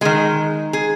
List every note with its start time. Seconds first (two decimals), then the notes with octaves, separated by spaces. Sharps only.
0.01 D#3 G#3 G#4
0.73 G#4